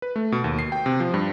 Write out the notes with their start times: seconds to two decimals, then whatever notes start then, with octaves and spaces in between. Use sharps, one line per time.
0.02 B4
0.16 A3
0.32 B2
0.44 D#2
0.59 C7
0.72 G5
0.86 C3
1.00 F3
1.14 G2